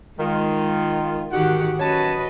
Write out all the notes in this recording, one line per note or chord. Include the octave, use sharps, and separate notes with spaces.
D#3 G#3 F4
G#2 D#3 F#4 G4 F#5
F#2 F#4 B4 C#5 D#5 A5